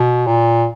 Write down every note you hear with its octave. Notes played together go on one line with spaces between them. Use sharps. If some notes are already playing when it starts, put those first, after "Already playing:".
Already playing: B2
A#2